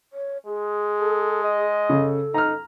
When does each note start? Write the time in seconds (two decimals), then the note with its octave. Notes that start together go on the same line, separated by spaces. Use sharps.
0.13 C#5
0.46 G#3 G#4
1.01 A4
1.44 D#5
1.90 C#3 A4
2.34 D#4 A#5 F6